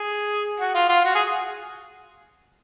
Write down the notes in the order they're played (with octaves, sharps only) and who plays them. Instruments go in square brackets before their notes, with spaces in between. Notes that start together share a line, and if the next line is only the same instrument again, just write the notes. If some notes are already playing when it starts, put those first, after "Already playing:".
Already playing: [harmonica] G#4
F#4
F4
F4
F#4
G#4